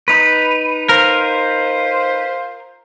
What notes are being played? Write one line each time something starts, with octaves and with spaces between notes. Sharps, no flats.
D#4 B4
F4 A#4 C5